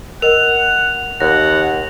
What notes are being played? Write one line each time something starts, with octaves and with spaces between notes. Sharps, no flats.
A#4 D#5 F#5 F7
D#2 F#5 A#6